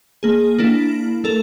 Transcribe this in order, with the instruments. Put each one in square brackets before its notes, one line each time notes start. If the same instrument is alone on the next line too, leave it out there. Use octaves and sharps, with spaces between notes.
[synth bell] A#3 G#4
A#3 D4 E4
A3 A4 A#4